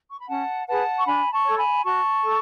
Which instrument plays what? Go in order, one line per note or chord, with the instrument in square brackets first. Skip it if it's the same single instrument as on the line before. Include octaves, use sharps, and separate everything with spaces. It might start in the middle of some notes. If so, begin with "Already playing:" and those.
[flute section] C#6
B5
C#4 F#5 A5
G#4 B4 F#5 A5
C#6
D4 G#5 B5
A5 C#6
A4 C#5
G#5 B5
F#4 A5 C#6
A4